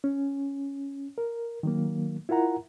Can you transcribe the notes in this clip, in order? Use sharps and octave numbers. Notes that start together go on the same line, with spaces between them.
C#4
A#4
D#3 F#3 A#3
E4 F4 A#4 F#5 A#5